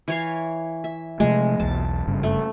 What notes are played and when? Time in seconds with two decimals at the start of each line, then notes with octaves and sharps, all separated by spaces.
0.08 E3 C#5 F5
0.84 E5
1.20 C3 F3 G#3 A3
1.60 B1 E2 A5
2.07 F#1 G2 C#3
2.23 A3